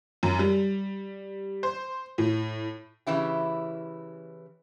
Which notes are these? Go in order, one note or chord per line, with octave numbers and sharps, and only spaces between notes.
F#2
G3
C5
A2
C#3 E3 E4 G4